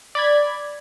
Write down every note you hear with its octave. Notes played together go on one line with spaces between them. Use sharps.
D5 B5 G#6